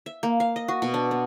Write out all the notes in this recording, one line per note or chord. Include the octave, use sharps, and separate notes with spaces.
E5
A#3
F5
D#5
F#4
B2
D4
B3